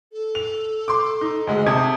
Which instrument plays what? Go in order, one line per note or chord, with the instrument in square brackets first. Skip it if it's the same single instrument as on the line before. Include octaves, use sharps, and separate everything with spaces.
[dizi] A4
[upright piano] F7
C6 D6
D#4
[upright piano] D2 G#3 [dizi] D#5
[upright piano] C3 A5 G#6 [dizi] D#6